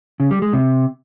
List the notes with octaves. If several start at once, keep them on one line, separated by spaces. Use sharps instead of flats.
C#3
G3
G#3
C3